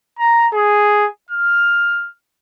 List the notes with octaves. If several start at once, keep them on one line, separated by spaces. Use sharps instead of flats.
A#5
G#4
F6